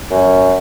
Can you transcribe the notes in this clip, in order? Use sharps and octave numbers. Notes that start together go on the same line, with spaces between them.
F#2